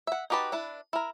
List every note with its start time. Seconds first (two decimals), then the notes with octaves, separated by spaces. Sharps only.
0.07 E5 F#5
0.30 D#4 F#4 G4 B4 A5
0.52 D4 E4 B4
0.93 E4 A#4